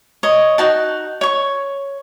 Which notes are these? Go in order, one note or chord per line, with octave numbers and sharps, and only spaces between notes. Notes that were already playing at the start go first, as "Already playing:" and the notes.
C#5 D#5
D#4 F#4 A5
C#5 C#6